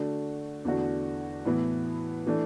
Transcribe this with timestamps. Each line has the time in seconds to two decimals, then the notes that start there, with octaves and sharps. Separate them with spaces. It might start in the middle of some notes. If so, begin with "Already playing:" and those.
Already playing: D3 A3 D4 F#4
0.65 E2 D3 A3 D4 F#4
1.45 A2 E3 B3 E4
2.27 E3 A3 D4